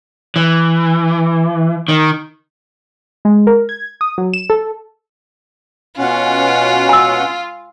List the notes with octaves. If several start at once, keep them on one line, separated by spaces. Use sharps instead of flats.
E3
D#3
G#3
A#4
G#6
D#6
F#3
E7
A4
B2 C#4 F4 F#5
G#5 E6